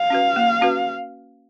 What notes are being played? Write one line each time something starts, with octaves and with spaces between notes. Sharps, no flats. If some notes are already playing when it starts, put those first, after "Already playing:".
Already playing: F5
C#4 F#4 B4
A#3
C#4 F#4 B4